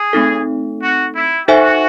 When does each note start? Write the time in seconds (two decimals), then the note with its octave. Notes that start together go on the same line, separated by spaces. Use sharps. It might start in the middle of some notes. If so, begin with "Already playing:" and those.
Already playing: G#4
0.13 A3 C4 D#4 A4
0.81 F#4
1.14 E4
1.48 D#4 F#4 A4 C5 E5 G#5